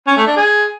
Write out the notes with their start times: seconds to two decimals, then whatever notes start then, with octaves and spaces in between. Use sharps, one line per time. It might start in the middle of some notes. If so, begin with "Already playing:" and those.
0.07 C#4
0.17 A3
0.27 D4
0.36 G#4